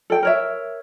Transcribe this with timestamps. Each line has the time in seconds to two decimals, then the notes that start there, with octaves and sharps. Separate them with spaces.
0.10 A4 G5
0.23 A#4 C#5 E5